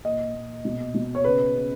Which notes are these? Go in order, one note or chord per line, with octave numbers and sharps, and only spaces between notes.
A#2 D#5
A#2
B2
B2
C#5
C#3 B4
C#3